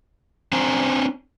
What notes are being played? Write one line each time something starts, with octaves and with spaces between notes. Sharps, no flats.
C4 D4 C5 G#5 A#5